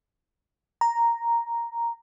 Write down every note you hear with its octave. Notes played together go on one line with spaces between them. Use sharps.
A#5